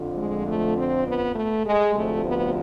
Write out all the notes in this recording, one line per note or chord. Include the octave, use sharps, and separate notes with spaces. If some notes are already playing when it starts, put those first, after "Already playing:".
Already playing: F2 D3 F3
G#3
A3
C4
B3
A3
G#3
D2 C3 F3 A3
B3